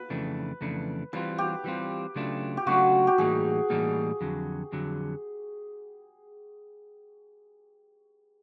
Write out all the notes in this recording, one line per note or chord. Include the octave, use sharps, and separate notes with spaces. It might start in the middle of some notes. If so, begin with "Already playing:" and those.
Already playing: B4
F2 C#3 E3 A3 D4
F2 C#3 E3 A3 D4
E3 G3 C4 F4 B4
G4
E3 G3 C4 F4
C#3 F#3 A3 D4 F4
G4
C#3 F#3 A3 D4 F4 F#4
G4
A2 E3 G3 A#3 D#4 G#4
A2 E3 G3 A#3 D#4
F2 D3 F#3
F2 D3 F#3